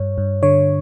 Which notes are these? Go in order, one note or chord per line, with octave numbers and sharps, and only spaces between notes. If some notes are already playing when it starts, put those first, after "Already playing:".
Already playing: G2 C#5
G2
D3 C#5